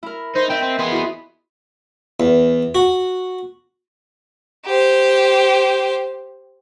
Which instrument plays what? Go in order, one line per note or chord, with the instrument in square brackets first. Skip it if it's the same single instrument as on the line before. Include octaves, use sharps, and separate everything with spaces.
[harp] E4 A#4
[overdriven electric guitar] D#4 [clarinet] C5
[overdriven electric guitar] C4 [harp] D#5 E5 [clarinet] G5
[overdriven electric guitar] C4
[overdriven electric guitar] B3 G#4 [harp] B4 C6
[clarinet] E4 [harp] F#4 D#6
[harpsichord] E2
F#4
[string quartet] G4 C5